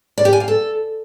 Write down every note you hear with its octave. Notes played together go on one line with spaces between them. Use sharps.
D5
G4
G#5
F5
A4